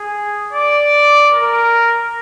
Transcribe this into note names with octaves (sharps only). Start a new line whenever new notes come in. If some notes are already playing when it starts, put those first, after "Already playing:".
Already playing: G#4
D5
A#4